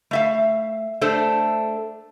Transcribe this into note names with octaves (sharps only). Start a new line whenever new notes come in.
A3 E5 F5
A3 D4 A4 C5